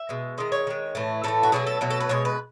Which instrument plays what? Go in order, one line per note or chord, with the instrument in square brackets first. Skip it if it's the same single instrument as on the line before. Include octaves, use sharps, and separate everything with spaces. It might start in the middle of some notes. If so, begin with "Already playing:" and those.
Already playing: [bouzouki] E5
B2 G#3
D#3 G#3 D#5
C#5
D#3 G#3
A2 E3 A3
A2 E3 A3 A4
F#4
B2 F#3 A3 G#4
A4
B2 F#3 A3
A4
B4
B2 G#3 C#5
B4